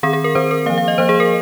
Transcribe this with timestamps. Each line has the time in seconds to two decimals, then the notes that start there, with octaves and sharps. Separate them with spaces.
0.03 D#3 C4 G#4
0.13 G#4
0.24 A#4
0.35 D#3 C4 C5
0.51 A#4
0.66 A#3 F5
0.70 F3
0.78 F5
0.88 D#5
0.98 F3 A#3 C5
1.09 G#4
1.20 A#4